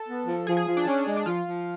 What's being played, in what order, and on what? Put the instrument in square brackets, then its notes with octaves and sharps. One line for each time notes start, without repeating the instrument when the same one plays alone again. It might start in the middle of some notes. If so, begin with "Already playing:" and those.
Already playing: [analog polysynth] A4
[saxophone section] B3
F3
[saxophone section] F3 [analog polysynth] G#4
[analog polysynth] G#4
[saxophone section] F3
[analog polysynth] D4
[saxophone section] C#4
G#3
[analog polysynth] D4
[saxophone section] F3 [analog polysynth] F4
[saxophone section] F3